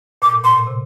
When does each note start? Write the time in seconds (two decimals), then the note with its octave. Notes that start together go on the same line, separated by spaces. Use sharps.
0.22 A#2 D6
0.33 A2
0.44 A#2 C6
0.56 A#2
0.67 C3